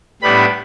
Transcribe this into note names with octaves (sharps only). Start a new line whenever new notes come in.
A2 G3 B3 D4 B5